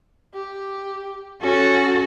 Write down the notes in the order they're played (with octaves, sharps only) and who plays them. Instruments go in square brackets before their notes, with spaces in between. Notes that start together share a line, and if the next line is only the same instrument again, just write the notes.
[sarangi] G4
[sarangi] C#4 [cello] F#4 A4